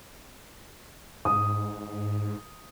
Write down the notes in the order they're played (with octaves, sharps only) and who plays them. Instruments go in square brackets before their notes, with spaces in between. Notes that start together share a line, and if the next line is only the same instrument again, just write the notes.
[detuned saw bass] G#2 [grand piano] D#6